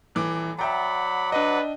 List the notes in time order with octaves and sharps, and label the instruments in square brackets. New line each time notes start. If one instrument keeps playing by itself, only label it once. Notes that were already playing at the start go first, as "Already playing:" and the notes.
[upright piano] D#1 E3 D6
[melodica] F#3 D5 F#5 [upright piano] E5 G5 A#5 [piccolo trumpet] B5
[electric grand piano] D4 D#5 [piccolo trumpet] B4